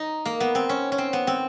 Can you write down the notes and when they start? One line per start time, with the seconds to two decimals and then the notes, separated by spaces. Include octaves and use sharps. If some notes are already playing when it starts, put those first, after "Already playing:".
Already playing: D#4
0.25 A#3
0.40 B3
0.55 C4
0.69 C#4
0.92 C#4
0.98 C4
1.13 B3
1.27 C4